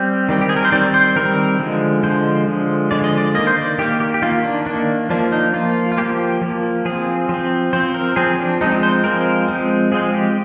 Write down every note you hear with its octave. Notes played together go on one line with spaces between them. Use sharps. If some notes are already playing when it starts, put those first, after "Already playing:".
Already playing: G3 C4 G4
D#3 G3 C4
G4
G#4
A#4
C5
D#3 G3 C4 D5
C5
D#3 G3 C4 A#4
D3 F3 G#3
D3 F3 G#3 C5
D3 F3 G#3
D3 F3 G#3 D5
D#5
D5
D#3 A#3 D#5
C5
D5
D#3 A#3 G4
G4
G4
D#3 A#3 F4
D4
D#3 A#3 D4
F3 A#3 D4
D#4
F3 A#3 F4
F4
F3 A#3 G4
F3 A#3
F3 C4 G#4
F3 C4
F3 C4 C5
A#4
F3 C4 G#4
D4
F3 G#3 C4 D#4
C5
F3 G#3 C4 A#4
F3 G#3 C4
F3 G#3 C4 G#4
G4